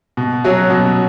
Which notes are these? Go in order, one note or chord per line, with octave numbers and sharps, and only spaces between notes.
B2
F#3 C#4 F#4
B2